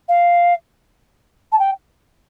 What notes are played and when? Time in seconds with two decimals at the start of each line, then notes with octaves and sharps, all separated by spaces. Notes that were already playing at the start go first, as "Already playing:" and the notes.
0.08 F5
1.52 A5
1.59 G5